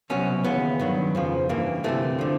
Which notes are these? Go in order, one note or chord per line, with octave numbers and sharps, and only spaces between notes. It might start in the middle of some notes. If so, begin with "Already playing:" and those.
C2 B2 F#3 C#4
D#2 C#3 E3 B3
G2 D#3 F#3
F2 C#3 F3
G2 E3 A#3
D2 C3 E3 A3
D3 F3